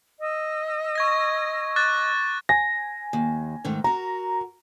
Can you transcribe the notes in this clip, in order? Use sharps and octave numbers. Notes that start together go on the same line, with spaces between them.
D#5 E6
C#6 G#6 A#6
D6 F#6 A6
G#5 A#6
D#2
G#2 D#3 A3
F#4 A#4 A#5